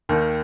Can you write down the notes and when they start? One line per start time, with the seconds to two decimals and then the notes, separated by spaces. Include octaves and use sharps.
0.09 D#2 D#3